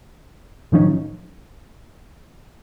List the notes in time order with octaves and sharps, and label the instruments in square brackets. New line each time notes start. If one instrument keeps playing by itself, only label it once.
[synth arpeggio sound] A2 D#3 F3 F#3 C#4 D#4